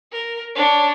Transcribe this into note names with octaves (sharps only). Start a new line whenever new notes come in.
A#4
D4 C#5